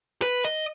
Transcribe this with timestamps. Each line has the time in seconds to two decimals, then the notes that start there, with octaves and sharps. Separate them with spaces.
0.22 B4
0.45 D#5